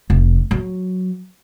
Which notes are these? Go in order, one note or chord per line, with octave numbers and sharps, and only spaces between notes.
F1
F#3